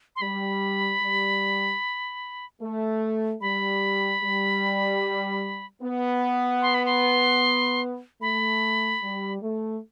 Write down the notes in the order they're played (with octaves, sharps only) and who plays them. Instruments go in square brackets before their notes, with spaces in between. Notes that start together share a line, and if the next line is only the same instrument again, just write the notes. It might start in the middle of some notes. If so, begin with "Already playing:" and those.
[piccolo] C6
[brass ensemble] G3 [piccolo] B5
[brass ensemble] G3
A3
[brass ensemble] G3 [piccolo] B5
[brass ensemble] G3
B3
[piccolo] C6
B5
C6
[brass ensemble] A3 [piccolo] B5
[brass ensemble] G3
A3